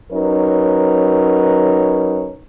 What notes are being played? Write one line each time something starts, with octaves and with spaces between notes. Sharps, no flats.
F#3 C#4 D#4 A#4 B4 C#5